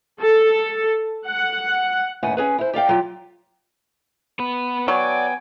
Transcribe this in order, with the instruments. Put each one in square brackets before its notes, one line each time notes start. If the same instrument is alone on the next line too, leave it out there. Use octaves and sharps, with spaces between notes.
[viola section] A4
F#5
[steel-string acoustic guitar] D#2 A2 C#4 B4 F#5 G#5
C#4 G#4 B4
E4 C5
G4 D5 F5 G5
F#3 F4 G4
[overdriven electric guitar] B3 B4
[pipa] F#3 [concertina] B3 G5 [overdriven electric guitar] D5 [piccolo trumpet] G#5